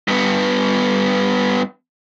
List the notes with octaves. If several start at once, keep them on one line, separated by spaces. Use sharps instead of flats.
G2 B3